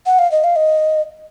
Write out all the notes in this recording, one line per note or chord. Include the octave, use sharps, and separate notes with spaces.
F#5
F5
D#5
F5
D#5